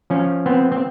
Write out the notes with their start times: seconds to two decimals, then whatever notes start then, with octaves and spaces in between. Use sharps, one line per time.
0.10 F3 C#4
0.46 B3 C4
0.72 C4